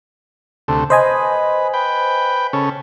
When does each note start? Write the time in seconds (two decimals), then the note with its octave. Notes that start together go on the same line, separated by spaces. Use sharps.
0.68 D2 C3 A3
0.90 B4 C5 D#5 G#5
1.74 B4 G5
2.53 C#3 C#4 A4